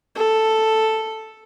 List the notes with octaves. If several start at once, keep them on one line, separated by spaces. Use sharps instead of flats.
A4